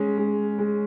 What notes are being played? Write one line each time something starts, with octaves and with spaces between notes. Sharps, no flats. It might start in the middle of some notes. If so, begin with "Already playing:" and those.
Already playing: G#3 C#4
G#3
G#3